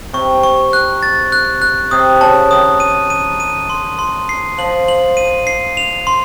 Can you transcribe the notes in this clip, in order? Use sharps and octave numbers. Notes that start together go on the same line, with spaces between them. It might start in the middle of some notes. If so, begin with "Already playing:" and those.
C3 C#6
C#6
F#6
A6
F#6
F#6
C3 D#6
C#3 A5
D#3 D#6
D#7
D#7
D#7
C6
C6
C7
F3 F#7
F#7
D#7
C7
F7
C6